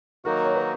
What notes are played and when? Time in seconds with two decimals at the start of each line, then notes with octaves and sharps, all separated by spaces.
0.25 D#3 F#3 A#3 D#4 F#4 A#4
0.45 C#5
0.55 B4